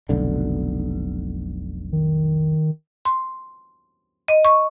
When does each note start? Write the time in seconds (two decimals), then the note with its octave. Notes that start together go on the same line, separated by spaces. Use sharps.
0.09 F1 B1 D3
1.92 D#3
3.05 C6
4.28 D#5
4.45 C#6